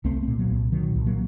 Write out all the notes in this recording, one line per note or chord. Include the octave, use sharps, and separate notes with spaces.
C2 A3 C4
A3 C4
A#2
F#3 A#3
C2
A#2 D#3 F#3
C2
F#3 A#3